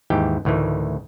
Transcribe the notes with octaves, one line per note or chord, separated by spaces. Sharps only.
D#2 G#2 E3 G4 G5
D2 A2 D#3 E3